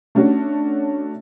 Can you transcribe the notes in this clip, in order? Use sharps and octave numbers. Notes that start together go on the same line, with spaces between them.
A3 C#4 D4 F#4